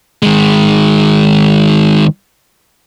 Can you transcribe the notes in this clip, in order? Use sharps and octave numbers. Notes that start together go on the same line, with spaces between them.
D#3 G#3